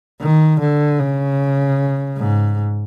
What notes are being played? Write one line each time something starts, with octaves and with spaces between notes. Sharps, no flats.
D#3
D3
C#3
G#2